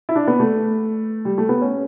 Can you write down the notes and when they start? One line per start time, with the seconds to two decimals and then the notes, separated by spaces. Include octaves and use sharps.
0.09 E4
0.16 D4
0.27 B3
0.40 A3
1.25 G3
1.38 A3
1.49 B3
1.62 C#4